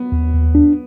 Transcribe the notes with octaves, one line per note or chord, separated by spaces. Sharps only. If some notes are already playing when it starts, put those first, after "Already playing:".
Already playing: B3
D#2
D#2
D4